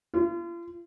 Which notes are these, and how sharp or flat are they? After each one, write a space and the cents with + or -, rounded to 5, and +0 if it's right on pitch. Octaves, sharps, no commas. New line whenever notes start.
F4 -40